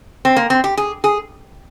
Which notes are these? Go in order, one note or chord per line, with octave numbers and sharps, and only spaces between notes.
C4
A#3
C4
G4
G#4
G#4